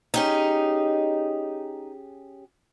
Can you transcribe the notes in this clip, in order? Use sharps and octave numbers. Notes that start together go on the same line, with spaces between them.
C#4 D#4 G4 G#4